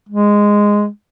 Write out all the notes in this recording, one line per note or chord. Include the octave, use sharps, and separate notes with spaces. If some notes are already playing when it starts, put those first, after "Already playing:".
G#3